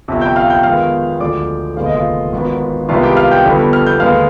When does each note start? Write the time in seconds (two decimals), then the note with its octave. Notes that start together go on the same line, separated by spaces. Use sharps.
0.08 G1 F2 C3
0.21 G5 G6
0.36 F5 F6
0.50 G5 G6
0.63 F2 D#3 G#3 B3 F5 F6
1.20 D2 D3 F3 G#3 D5 D6
1.76 F1 D#2 D3 G#3 B3 F5
1.86 D#5
1.96 F4 F5
2.32 G#1 G#2 D#3 B3
2.89 C2 C3 D#3 G#3 B3 F4 F5
3.03 G4 G5
3.17 F5 F6
3.31 G5 G6
3.45 G1 F2 D3 G3 B3
3.73 F6
3.87 G6
4.00 D#2 D3 G#3 B3 F5 F6